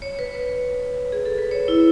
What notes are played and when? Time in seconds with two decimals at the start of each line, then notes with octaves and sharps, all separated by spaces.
0.02 C#5
0.19 B4
0.35 B4
1.12 G#4
1.26 A4
1.39 B4
1.51 C#5
1.68 E4